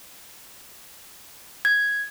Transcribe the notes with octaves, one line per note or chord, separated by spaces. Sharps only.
G#6